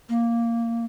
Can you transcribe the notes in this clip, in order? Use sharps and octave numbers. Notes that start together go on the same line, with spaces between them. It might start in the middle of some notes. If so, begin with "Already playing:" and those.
A#3